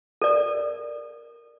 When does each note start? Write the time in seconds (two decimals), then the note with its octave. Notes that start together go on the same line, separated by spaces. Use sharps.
0.22 A4 A#4 D5